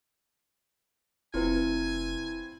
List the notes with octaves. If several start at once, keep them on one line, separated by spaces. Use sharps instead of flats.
F1 C4 E4 F4 B4 G#5